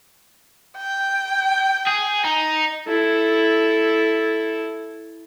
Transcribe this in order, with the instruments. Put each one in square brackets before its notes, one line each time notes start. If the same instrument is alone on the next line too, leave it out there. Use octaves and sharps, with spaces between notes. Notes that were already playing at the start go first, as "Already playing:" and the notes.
[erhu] G5
[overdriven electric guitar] G#4
D#4
[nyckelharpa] E4 A4